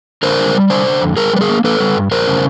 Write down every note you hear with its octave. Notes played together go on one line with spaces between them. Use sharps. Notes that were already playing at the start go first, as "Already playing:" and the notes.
D3 A#4 C5
G3
G3
D3 C5 D5
D3
F2
G3 G#4 A#4
G3 B4
G#4 A#4
A#3
A#3 A4 B4
G3
G2
F#2 A#4 C5
C#3